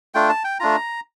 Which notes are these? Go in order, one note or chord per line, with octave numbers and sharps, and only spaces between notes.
A3 D4 F4 G5
A5
G5
A3 D4 F4 A#5